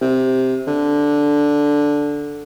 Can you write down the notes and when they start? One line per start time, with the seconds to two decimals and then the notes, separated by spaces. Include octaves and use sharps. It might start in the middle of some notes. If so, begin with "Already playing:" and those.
0.01 C3
0.67 D3